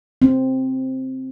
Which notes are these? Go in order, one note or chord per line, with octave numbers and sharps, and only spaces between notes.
C4